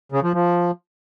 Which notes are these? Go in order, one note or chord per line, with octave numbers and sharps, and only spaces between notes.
C#3
F3
F3